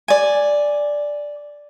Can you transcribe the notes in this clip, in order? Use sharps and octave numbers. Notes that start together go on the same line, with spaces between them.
D5 G#5